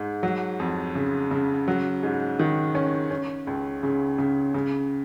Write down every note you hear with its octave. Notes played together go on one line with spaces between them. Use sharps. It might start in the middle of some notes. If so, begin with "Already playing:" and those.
Already playing: G#2
F#3
F2
C#3
C#3
F#3
G#2
D#3
C#4
C#4
C#2
C#3
C#3
C#3